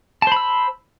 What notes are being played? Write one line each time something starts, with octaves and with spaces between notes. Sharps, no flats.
C5 A5 B5 E6